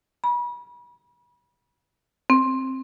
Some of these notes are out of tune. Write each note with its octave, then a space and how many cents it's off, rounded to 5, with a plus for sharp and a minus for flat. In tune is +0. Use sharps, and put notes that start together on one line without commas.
B5 -35
C4 +10